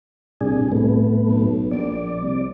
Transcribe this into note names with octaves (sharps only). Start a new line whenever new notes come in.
C2 A#2 D4 G#4
A2 A3 B3
B1
A#1 D5
C2